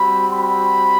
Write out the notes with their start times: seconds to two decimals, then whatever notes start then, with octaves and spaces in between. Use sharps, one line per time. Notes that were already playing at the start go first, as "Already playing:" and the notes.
Already playing: G3 C4 F#4 B5
0.31 B5